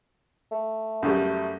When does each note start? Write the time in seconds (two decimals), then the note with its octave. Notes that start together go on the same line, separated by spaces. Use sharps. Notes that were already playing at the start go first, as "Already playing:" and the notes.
0.51 A3
1.02 F#2 C#3 G3 A3